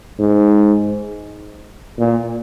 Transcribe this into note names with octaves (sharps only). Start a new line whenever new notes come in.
G#2
A#2